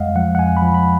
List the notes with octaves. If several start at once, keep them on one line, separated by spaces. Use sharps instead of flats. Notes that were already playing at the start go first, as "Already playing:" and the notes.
Already playing: F2 G#3 D#5 F5 F#5
F3 F#5
F#5
F2 G#5
B5
F3
B5